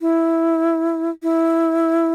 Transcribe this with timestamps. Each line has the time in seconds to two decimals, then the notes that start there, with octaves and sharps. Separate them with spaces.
0.01 E4
1.23 E4